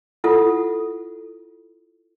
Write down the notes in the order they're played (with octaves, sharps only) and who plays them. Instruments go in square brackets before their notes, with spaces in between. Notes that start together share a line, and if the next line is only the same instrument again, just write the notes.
[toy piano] E4 F4 A4 F#5 D#6